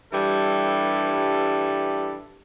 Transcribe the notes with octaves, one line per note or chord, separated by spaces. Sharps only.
G2 E3 G3 A4